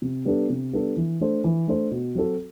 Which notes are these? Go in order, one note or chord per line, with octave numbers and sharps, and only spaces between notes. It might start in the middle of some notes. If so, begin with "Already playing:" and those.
C3
G3 B3 D4 A4
C3
G3 B3 D4 A4
E3
A3 D4 A4 C5
E3
A3 D4 A4 C5
B2
F#3 C4 F#4 A4